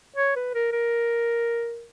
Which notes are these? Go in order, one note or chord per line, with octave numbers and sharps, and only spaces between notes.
C#5
B4
A#4
A#4